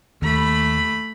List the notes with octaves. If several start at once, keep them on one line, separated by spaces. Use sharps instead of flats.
D#2 A3 B5